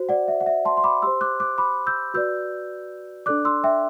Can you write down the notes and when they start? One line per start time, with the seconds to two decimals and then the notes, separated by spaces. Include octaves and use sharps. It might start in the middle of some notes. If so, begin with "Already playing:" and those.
Already playing: F#4 C5
0.09 D5 F#5
0.28 E5
0.41 F#5
0.46 E5
0.65 A5 C6
0.77 C6
0.84 B5 D6
1.02 G4 C5 C6 E6
1.21 D6 F#6
1.40 D6 F#6
1.58 B5 D6
1.87 E6 G6
2.14 F#4 B4 D5 E6 G6
3.26 D4 A4 D5 D6 F#6
3.45 C6 E6
3.64 E5 G5